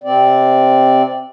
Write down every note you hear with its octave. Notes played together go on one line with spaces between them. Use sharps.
C3 C4 D5